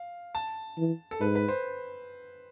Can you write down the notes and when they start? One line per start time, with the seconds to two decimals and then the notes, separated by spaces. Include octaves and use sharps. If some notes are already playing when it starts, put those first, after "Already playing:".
Already playing: F5
0.35 A5
0.78 E3
1.11 A4
1.20 G#2 B4
1.35 B4
1.48 C5